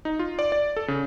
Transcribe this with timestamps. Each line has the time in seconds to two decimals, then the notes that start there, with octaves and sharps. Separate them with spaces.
0.05 D#4
0.19 F4
0.39 D5
0.52 D5
0.76 A4
0.88 C#3